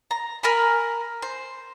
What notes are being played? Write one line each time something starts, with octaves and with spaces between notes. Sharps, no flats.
A#5
A#4 G#5 B5
C5